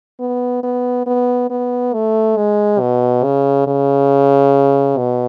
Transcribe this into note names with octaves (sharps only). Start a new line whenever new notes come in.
B3
B3
B3
B3
A3
G#3
B2
C#3
C#3
B2